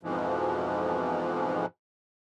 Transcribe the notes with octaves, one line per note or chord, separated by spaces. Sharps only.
F2 G#2 B2 E3 F3